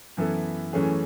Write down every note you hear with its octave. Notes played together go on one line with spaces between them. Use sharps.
F#2 E3 B3 E4 A4
F#2 E3 A3 C#4 G#4